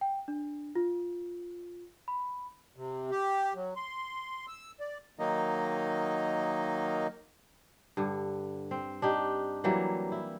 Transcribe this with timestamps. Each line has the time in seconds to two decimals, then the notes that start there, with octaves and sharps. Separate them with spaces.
0.01 G5
0.28 D4
0.75 F4
2.08 B5
2.76 C3
3.11 G4
3.55 F#3
3.76 C6
4.48 E6
4.80 D5
5.19 D#3 F#3 A#3 D#4 D#5
7.97 G2 D3
8.71 C4
9.02 D4 D#4 G4
9.64 E3 F#3 G3 A#3
10.12 E4